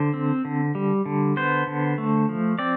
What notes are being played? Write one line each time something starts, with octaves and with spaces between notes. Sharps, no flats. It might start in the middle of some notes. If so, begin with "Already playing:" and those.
Already playing: D3 C5
C4
D3
G3
D3
B3 C5
D3
A3
F3
C4 D5